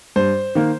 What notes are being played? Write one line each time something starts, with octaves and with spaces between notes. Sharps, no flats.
G2 C5
D#3 A#3